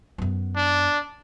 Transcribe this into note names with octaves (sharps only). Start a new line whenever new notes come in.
F#2 B3
D4